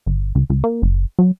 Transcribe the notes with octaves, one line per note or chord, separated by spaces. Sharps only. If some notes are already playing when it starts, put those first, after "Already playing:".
G1
C#2
C#2
A#3
F#1
F#3